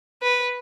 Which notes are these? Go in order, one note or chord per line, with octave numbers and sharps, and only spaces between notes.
B4